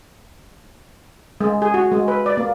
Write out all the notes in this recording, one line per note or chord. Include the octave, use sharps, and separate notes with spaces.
G#3
G#4
F#4
G#3
B4
D5
A#3